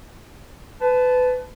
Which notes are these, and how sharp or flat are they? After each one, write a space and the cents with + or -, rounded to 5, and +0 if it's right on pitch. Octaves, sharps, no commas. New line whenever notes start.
B4 +25 A5 -15